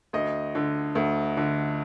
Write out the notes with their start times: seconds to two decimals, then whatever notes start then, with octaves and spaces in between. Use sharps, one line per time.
0.13 D2 D#5
0.55 D3
0.95 D2
1.37 D3